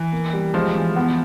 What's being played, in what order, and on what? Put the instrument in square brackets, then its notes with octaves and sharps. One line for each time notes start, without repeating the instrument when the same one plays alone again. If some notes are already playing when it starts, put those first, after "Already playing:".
Already playing: [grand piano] E3
[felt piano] A#3
G3
[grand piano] F3 [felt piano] G#3
[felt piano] E3
B3